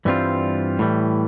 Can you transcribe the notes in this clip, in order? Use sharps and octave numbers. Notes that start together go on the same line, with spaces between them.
G2 E3 G3 C4 F4
A2 E3 G3